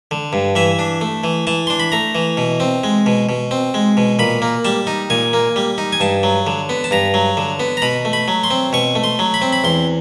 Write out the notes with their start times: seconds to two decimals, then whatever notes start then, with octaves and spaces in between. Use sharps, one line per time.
0.11 D3
0.33 G2
0.56 E3 E5
0.79 D4
1.01 A3
1.24 E3
1.47 E3 A5
1.67 D4 C6
1.80 B5
1.92 A3 A#5
2.15 E3
2.37 B2
2.60 C4
2.84 G#3
3.06 B2
3.29 B2
3.51 C4
3.74 G#3
3.97 B2
4.19 A#2 B5
4.42 A#3
4.65 G3 A5
4.87 D#4
5.10 A#2 G#5
5.33 A#3
5.56 G3
5.78 D#4
5.92 G#5
6.00 G2 A5
6.23 F#3
6.47 D3
6.69 B3
6.84 A5
6.91 G2 A#5
7.14 F#3
7.37 D3
7.60 B3
7.77 A#5
7.82 B2 B5
8.05 A3
8.13 B5
8.28 F#3
8.44 C6
8.50 C4
8.73 B2 C#6
8.95 A3
9.04 C6
9.19 F#3
9.34 B5
9.42 C4
9.53 B5
9.64 E2 C6